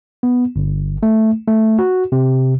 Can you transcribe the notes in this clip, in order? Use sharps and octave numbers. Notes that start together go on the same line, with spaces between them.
B3
G1
A3
A3
F#4
C3